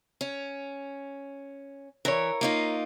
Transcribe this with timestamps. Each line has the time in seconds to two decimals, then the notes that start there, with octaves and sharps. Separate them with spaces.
0.21 C#4
2.05 E3 A#4 C#5
2.41 A#3 D#4 F4